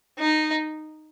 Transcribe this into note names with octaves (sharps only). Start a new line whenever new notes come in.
D#4